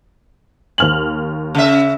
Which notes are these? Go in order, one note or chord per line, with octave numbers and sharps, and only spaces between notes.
D#2 F6 F#7
C#3 E5